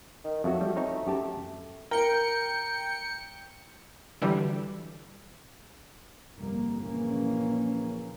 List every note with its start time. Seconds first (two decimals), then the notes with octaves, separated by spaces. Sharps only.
0.24 D#3
0.44 F2 F#3 A3 F#4
0.61 G3
0.76 C4 D#4 C#5
1.07 F#2 G4 A5
1.91 A#4 G5 C#7
4.22 D3 E3 F#3 G3
6.37 G1 C2 F2 A#3
6.79 A#1 C#3 E3 A#3 C#4